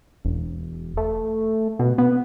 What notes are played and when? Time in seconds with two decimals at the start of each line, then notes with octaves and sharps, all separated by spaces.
0.25 E1
0.97 A3
1.79 B2
1.98 B3